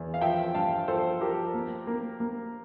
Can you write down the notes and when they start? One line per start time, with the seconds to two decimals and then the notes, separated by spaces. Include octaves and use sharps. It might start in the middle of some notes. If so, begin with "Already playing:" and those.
Already playing: E2
0.14 F5
0.21 F3 E5 G5
0.54 G2 F5 A5
0.88 F3 A4 C5
1.21 F3 G4 A#4
1.54 A#3
1.87 A#3
2.20 A#3